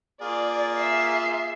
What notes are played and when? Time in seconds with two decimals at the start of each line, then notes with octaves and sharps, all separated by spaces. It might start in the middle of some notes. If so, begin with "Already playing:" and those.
0.22 A#3 F4 G#4 D5
0.78 E5 C7